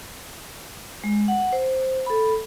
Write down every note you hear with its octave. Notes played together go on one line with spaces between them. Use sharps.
G#3
F#5
C5
A4 B5